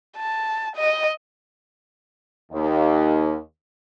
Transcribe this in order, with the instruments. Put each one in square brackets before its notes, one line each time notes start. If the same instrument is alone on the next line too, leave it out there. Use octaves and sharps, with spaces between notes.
[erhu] A5
D#5
[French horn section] D#2